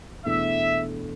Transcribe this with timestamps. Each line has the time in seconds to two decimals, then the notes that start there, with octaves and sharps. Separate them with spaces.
0.25 E2 B2 A3 D4 E5